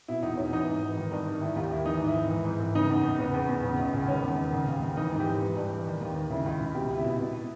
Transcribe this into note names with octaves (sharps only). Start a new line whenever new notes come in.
B2 E4
E2 D#4
B2 C#4
E3 D#4
G#2
E3
D#3
G2
D#3
D#3 E4
D#2 G4
D#3 E4
E3 D#4
G#2
E4
E3
E3
G#2
E3
C#3 D#4
E2
E2
C#3 B3
E2
E2
C#3
C#2
C#2
D#3 C#4
E2
D#3
C#3
D#2
D#2
E3 D#4
G#2
G4
E3
E3
G2
E3
D#3
D#2
D#3
C#3 E4
C#2
C#2
B2 G4
C#2
E4
B2
B2